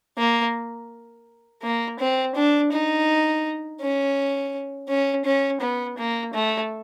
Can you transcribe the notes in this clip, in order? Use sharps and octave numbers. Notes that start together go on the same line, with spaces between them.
A#3
A#3
C4
D4
D#4
C#4
C#4
C#4
B3
A#3
A3